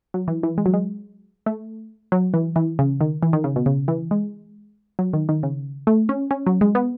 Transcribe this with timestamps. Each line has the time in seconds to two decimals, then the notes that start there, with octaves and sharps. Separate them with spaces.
0.14 F#3
0.28 E3
0.43 E3
0.58 G#3
0.66 F#3
0.74 G#3
1.46 A3
2.12 F#3
2.34 E3
2.56 E3
2.79 C#3
3.01 D#3
3.23 E3
3.33 D#3
3.44 C#3
3.56 B2
3.66 C#3
3.88 E3
4.11 G#3
4.99 F#3
5.13 D#3
5.29 D#3
5.43 C#3
5.87 A3
6.09 C#4
6.31 C#4
6.46 F#3
6.61 G#3
6.75 B3